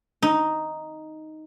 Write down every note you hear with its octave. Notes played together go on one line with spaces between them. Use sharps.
D#4